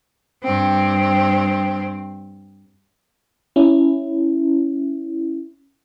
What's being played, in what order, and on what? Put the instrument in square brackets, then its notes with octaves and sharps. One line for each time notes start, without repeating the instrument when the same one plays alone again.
[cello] G2 C4
[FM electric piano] C#4 E4